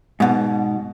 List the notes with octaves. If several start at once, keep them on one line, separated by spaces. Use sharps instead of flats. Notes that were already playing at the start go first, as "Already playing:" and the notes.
G#2 B2